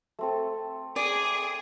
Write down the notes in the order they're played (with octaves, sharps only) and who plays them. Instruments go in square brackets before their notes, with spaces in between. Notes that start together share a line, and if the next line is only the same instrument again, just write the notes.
[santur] A3 C4 A4
[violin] G#4 [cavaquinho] D5